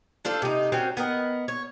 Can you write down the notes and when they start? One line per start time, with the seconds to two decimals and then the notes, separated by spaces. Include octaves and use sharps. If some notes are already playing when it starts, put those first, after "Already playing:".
0.25 D4 F4 A4 C5
0.42 C3 D#4
0.72 F#3 C4 C#4 A#4
0.97 B3 A#4 D#5
1.48 C#5